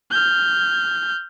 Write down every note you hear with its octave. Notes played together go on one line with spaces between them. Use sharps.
F6 G6